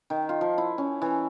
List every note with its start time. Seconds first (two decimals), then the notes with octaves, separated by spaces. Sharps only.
0.10 D#3
0.29 F4
0.41 F3
0.58 E4
0.78 C#4
1.02 E3